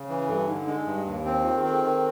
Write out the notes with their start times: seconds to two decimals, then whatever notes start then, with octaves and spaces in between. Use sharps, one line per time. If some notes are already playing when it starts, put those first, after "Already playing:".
Already playing: C#3
0.09 E3
0.29 G2 A4
0.48 D3 D#4
0.67 G#3 D4
0.87 G2
1.06 D#2
1.26 C4
1.45 D#3 F4
1.58 G#4
1.64 C4
1.71 A4
1.84 D#3 A#4